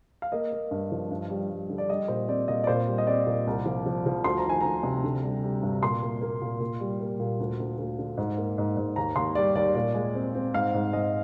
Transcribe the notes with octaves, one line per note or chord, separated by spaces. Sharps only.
F5
A#3 D#5
A#3
G2
F3
G2
G3
G3
D3
D5
G3 D#5
A#2 C5
C4 D5
A#2 D#5
D5
A#2 C5
G3
D#5
C4 D5
A#2
C2
F3
F3
F3
D2 C6
A#5
D#3 G#5
D2 A#5
C3
D3
G3
G3
G2
A#2 C6
A#3
A#3
A#2
A#2
G3
A#3
A#2
D2
D2
D2
D3
G#2
A#3
G#2
G#2
D#2 A#5
D#2 C6
G3 D5
D#2 D5
A#2 D5
G#3
C4
C4
G#2 F5
G#2
G#3 D#5